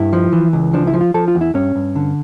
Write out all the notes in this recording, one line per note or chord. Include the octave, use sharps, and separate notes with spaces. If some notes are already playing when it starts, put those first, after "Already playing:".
Already playing: G2 E4
F3
E3
C#2
F3 D4
E4
F3
F4
F3 A4
F4
E2
E4
G2 C#4
G2
D3